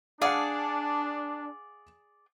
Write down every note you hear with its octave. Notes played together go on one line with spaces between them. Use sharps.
D4 G#4 D5 F5 F#5